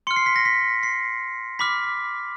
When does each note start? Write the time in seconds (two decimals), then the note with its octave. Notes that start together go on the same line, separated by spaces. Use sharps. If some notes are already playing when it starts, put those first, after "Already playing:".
0.07 C6 C#7
0.11 F6
0.16 C7
0.26 B6
0.36 A#6
0.45 B6
0.83 C7
1.59 B5 D6 F6 B6